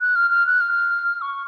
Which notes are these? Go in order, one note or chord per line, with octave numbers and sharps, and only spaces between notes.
F#6
F6
F6
F#6
F6
C#6